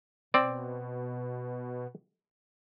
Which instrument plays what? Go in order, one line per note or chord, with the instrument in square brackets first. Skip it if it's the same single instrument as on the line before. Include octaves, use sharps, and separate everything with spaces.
[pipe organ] B2 [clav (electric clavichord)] C4 D5